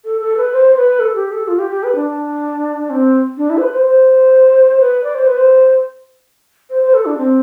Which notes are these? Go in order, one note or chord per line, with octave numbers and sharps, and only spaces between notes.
A4
A4
B4
C5
C5
B4
A4
G4
A4
F4
G4
G4
B4
D4
C4
D4
E4
C5
B4
C5
C5
B4
D5
C5
B4
C5
C5
C5
A4
D4
C4